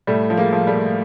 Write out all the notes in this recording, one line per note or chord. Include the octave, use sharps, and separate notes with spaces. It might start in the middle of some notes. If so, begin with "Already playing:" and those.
A2 G3 A3
F3
G#3 A#3
F3
G3 A3
A2